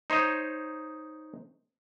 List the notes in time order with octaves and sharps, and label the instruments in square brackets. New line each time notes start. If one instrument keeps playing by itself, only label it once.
[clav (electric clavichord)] D#4 C5 C#5 D#5